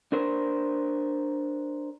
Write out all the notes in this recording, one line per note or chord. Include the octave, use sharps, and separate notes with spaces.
D4 A#4 C5